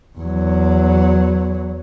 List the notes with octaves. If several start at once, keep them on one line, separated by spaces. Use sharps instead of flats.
E2 F#3